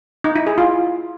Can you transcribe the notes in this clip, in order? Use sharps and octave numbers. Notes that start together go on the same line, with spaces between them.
D#4
E4
G#4
F4